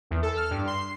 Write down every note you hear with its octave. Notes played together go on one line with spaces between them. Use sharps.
E2
A4
F6
G2
C6
C7